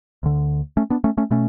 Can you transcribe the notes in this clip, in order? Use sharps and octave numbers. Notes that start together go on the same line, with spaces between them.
D2 D3
A3 C#4
B3 D4
A3 C#4
A3 C#4
B2 A3 C#4